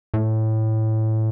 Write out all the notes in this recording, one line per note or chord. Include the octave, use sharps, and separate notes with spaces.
A2